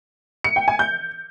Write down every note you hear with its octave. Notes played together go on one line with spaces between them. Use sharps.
C#7
G5
G#5
G6